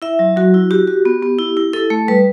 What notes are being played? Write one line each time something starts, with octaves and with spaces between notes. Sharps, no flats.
E4 E5
F#3
F#3 F#4
E4
F#4 G4
F#4
B3
B3
E4
E4
E4 A4
A3
G3 B4